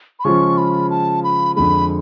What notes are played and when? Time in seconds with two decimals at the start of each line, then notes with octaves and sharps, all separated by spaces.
0.20 B5
0.24 C#3 F3 G#3 C#4 F4 C#6
0.58 B5
0.91 A5
1.24 B5
1.56 F2 D3 G#3 B5